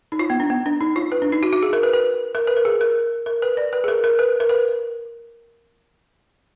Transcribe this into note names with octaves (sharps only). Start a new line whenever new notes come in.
D#4
F4
B3
D4
B3
D4
D#4
F4
B4
D4
D#4
F#4
F#4
G#4
A#4
B4
B4
A#4
B4
A#4
G#4
A#4
A#4
B4
D5
B4
G#4
A#4
A#4
B4
A#4
B4